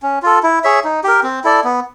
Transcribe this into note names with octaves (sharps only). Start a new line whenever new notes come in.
C#4
F4 A4
E4
G#4 C#5 E5
D#4
G4 A#4
C4
E4 A4 D5
B3